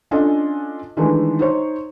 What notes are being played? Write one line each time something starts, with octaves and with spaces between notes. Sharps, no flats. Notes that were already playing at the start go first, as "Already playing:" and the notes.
C#4 D4 F4 A4 D#5 G#5
D#3 E3 G#3 A3 D4
D#4 C5 C#5